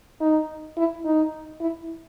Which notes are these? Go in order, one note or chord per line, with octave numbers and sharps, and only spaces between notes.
D#4
E4
D#4
E4